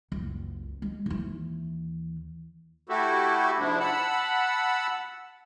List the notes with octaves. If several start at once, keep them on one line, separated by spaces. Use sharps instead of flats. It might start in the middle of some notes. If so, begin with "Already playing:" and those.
F#1 C#2
G#3
D#2 E3
A3 E4 F#4 G4 A4
G#2 C3 F3 G#3 D4 E4
F#5 A5 B5 E6